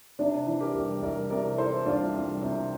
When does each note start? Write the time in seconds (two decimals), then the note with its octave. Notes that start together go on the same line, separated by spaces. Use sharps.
0.19 C3 D4
0.47 E3
0.60 G4 A#4
0.74 C2
1.02 C2 A#4 D5
1.30 C3 A#4 D5
1.58 E3 A4 C5
1.86 C2 D4 F4
2.14 C2
2.42 C3